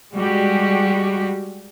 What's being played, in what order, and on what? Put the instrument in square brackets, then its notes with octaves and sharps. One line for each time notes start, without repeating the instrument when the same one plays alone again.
[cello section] G3 G#3 F#4 G4